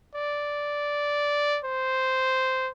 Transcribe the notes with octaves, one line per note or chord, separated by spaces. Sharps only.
D5
C5